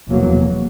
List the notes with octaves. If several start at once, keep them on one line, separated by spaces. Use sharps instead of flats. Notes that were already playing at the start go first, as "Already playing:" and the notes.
F1 E2 B2 F#3 A#3